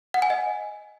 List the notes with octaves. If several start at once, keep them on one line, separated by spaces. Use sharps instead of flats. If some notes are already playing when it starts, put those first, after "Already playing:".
F#5
G#5
D#5